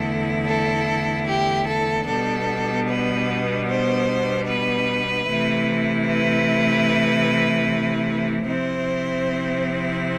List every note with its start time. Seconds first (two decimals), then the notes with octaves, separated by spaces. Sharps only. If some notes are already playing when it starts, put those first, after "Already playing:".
Already playing: E2 D3 A3 E4 A4
0.48 A4
1.28 G4
1.68 A4
2.07 B2 G3 B3 D4 A4
2.89 B4
3.68 C5
4.48 B4
5.28 C3 E3 A3 E4
6.08 B4
8.47 C3 F3 C4 E4 C5